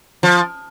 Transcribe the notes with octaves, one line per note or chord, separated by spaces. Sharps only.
F3